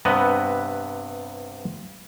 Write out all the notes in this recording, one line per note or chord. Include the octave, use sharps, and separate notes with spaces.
G2 C3 B3 B4 D#5